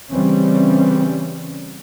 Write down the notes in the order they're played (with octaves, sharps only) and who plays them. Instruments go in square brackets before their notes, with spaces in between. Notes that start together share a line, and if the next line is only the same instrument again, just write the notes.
[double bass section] C#3 E3 G3 C4 C#4